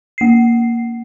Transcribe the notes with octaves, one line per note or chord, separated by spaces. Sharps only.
A#3 C7